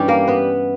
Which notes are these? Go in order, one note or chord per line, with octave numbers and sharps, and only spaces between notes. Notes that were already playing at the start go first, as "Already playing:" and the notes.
Already playing: G2 E3 G3 C#4 G4
A#3 A#4
B3 B4